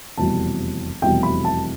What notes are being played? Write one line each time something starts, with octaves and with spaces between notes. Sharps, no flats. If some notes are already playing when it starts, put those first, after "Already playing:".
F1 E2 B2 G3 A5
F1 E2 B2 G3 G5
B5
A5